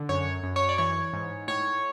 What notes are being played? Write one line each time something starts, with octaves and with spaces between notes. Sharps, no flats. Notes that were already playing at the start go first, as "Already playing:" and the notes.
Already playing: D3
F#2 C#5
F#2
C#5
D5
E3 C#5
G#2
A2 C#5